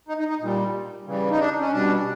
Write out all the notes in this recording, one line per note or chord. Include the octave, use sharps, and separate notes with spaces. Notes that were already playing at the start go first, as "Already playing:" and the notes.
D#4
D#4
D#4
A#2 G3
C#3 E3 G3
D#4
D4
C#4
B2 G3 D4